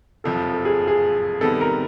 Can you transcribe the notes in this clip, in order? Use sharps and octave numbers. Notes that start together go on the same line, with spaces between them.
F#1 F2 C3 F3 A4
A4
G#4
G#4
C3 D#3 G3 B3 A4
A#4